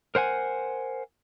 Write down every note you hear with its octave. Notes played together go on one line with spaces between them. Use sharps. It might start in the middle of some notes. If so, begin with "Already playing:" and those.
A#4 C5 F#5 G#5